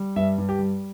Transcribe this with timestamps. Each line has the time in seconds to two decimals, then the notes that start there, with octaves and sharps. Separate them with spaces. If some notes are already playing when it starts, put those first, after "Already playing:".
Already playing: G3
0.16 G2 E5
0.38 G2
0.49 G4
0.59 G3